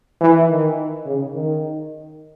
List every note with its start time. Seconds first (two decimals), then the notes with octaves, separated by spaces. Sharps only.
0.21 E3
0.49 D#3
1.05 C#3
1.34 D#3